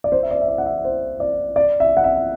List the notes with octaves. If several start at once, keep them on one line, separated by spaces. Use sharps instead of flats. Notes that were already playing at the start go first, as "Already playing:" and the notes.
D5
C5
E5
D5
E5
D5
F#5
E5
C5
D5
D5
E5
F#5
E5